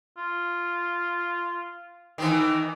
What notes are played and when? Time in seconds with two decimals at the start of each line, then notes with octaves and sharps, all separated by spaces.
0.17 F4
2.18 D#3 E3
2.57 D#5